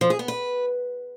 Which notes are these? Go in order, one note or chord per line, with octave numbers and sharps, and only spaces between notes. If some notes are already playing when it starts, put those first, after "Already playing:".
F3
G#4
B3
B4